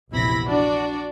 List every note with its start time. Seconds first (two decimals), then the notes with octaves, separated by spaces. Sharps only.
0.12 A#1 E2 C3 E4 B5 A#6
0.46 D4 F#4 D5